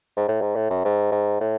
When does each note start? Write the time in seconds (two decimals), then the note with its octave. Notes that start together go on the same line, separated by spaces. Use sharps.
0.17 G#2
0.28 A2
0.42 G#2
0.56 A2
0.70 F#2
0.85 G#2
1.12 G#2
1.41 A2